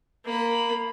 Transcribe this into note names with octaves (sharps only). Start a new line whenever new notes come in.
A#3 B5